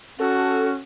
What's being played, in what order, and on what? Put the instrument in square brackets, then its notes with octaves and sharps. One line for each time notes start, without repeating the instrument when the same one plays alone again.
[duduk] C#4 [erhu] F#4 [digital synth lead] A4